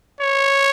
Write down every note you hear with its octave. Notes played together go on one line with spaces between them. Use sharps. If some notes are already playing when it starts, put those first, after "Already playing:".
C#5